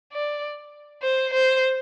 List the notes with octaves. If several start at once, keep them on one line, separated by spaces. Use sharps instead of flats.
D5
C5
C5